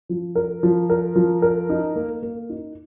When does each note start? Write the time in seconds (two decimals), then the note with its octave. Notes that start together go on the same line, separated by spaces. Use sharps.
0.09 F3
0.36 A#4
0.63 F3
0.90 A#4
1.16 F3
1.42 A#4
1.69 D#4
1.96 A#3
2.22 A#3
2.49 D#4